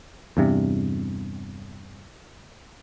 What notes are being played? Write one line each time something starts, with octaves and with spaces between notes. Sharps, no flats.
E2 G2 C3